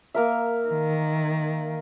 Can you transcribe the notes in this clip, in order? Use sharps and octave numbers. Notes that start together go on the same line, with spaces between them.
A#3 A#4 E5
D#3